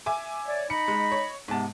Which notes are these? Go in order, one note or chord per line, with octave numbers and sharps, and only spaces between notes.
E5 G#5 D6
C#5 D5
D#4 D#5 B5 C#7
G#3
C#5
G#2 C3 B3 A5